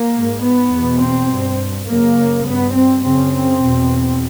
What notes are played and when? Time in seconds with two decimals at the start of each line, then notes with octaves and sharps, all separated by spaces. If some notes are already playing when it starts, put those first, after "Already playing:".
Already playing: A#3
0.14 G#2
0.43 B3
0.72 E2 B2
1.01 C4
1.30 G2
1.89 F#2 C#3 A#3
2.46 G2 B3
2.75 C4
3.05 F#2 C#3 C4
3.34 C4
3.63 E2 B2